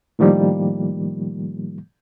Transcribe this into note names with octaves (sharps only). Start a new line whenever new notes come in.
A2 D#3 F3 G3 A#3